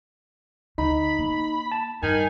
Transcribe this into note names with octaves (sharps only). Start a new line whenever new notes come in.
D2 D#4 B5
A#3
A5
G2 D#3 G#5